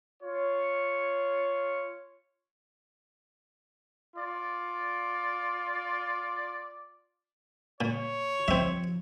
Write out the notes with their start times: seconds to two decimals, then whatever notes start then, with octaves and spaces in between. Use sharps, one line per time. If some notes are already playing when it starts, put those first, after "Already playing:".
0.23 F4 C#5
4.15 F4 D5
7.81 A#2 C#5
8.48 F3 C4 E5